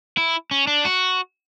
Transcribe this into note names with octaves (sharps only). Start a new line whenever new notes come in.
E4
C#4
D4
F#4